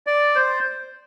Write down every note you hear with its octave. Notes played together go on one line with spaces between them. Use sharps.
D5
C5